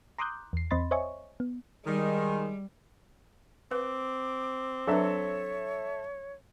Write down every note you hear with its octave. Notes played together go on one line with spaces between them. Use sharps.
A#5 C6 D6 D#6 F#6 G6
E2 C7
E2 C4 D#5 B5 C6 A6
C5 C#5 D#5 E5 G#5 C#6
B3
D#3 G3 G#3
C4 B4 D6
F#3 D4 A4 B4 C#5 E5